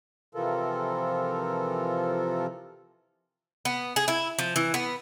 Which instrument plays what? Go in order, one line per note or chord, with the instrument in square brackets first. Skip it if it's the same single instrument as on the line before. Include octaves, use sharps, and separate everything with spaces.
[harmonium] C3 E3 F3 F4 A4 A#4
[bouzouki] B3
G#4
E4
F3
E3
B3